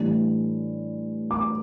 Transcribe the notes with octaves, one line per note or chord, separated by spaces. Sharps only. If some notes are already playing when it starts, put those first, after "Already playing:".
Already playing: A2 E3 G3 D4
D6